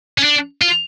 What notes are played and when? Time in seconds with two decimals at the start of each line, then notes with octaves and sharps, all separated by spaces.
0.18 C#4
0.24 D4
0.61 F4